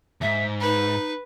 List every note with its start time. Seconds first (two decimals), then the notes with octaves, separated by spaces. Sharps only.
0.21 D#2 G#2 E5
0.61 D#4 B4